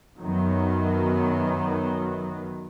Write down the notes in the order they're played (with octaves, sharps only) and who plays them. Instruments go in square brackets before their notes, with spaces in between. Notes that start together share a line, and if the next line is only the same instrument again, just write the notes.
[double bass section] F#2 D#3 F#3 B3